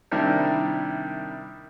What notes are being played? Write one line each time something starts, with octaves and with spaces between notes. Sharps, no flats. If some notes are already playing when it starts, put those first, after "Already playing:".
C3 D#3 G3 D4 E4 A#4